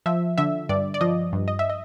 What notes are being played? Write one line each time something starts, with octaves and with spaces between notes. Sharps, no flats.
F3 E5
D3 E5
G2 D5
D5
F3 D#5
G2
D#5
E5
D#5